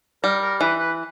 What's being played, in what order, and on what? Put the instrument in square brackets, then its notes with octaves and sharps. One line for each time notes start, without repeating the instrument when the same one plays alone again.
[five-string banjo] G3 [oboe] A#4
[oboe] A#4
[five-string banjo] E3 [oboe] B4
[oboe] B4